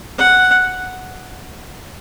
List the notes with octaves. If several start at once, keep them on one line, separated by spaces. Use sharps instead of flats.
F#5